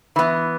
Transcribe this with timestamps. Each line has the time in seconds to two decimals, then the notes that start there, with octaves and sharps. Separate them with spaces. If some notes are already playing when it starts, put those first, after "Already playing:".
0.16 E3 B3